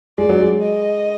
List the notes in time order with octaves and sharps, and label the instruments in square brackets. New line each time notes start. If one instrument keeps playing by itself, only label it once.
[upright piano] G#3 [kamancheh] D5
[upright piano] F#3
G#3
[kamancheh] D#5